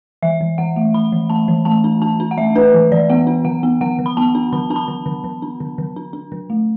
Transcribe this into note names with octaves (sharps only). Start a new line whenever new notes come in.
E3 E5
E3
E3 F#5
A3
A3 B5
E3
A3 A5
E3
A3 A5
D4
D4 A5
D4
F#5
A3 E5
D4 B4
E3
E3 D5
B3 F#5
D4
D3 F#5
B3
D3 F#5
D3
B5
B3 A5
D4
D3 B5
D4 A5
B5
D3
D3
D3
D4
D3
D3
D4
D4
D3
A3